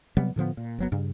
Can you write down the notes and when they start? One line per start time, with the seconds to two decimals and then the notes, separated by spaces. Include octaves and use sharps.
0.17 C3 F#3 G3 B3
0.36 A2 D3 F3 B3
0.57 A#2
0.78 F#1 F#3 B3
0.92 G2 C#3